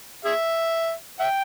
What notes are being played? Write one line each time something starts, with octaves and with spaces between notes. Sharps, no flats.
G#4 E5
E5 G5